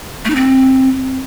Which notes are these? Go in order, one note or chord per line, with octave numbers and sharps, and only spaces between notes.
A3
D#4
C4